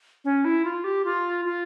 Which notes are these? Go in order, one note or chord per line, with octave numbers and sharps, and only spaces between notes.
C#4
E4
F4
G4
F4
F4